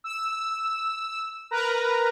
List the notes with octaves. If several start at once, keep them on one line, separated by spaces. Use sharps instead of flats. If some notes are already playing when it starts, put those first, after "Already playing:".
E6
A#4 B4 A#5